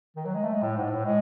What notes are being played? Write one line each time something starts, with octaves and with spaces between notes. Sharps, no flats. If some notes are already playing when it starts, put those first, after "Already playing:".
D#3
F#3
G#3
A3
G#3
A2
G#2
A2
G#3